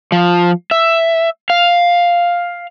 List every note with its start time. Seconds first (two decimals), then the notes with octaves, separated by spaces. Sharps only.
0.12 F3
0.71 E5
1.50 F5